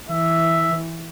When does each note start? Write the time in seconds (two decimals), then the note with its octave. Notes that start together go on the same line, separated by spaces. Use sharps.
0.10 E3 E5